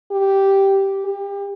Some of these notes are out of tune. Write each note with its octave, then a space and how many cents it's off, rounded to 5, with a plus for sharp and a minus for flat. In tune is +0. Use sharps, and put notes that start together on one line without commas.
G4 -5
G4 +30